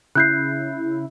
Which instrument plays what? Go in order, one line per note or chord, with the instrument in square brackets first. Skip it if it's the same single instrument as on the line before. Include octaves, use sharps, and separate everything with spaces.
[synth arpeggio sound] C#3 E4 [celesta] F#6 G6 C7